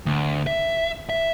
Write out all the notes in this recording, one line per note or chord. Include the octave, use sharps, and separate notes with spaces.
D2
E5
E5